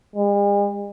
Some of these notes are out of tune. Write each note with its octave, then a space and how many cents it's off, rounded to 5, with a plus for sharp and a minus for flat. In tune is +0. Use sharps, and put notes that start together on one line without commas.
G#3 -45